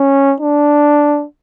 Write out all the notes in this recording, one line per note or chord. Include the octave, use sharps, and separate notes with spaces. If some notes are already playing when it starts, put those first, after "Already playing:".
Already playing: C#4
D4